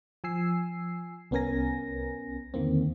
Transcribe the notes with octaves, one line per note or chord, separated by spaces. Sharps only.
F3 G#5 E6 C7
C2 B3 C#4 A#4 G#5 A#6
E2 D3 D#3 A#3 C4